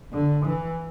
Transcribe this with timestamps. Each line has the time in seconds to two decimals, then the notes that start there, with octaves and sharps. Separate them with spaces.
0.13 D3
0.45 E3